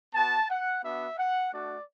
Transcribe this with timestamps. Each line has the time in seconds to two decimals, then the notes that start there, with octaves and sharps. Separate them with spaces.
0.13 B3 F#4 A5
0.49 F#5
0.83 B3 D4 F#4 E5
1.17 F#5
1.52 A3 D4 F#4 D5